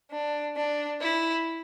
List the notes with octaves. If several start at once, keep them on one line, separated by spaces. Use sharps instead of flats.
D4
D4
E4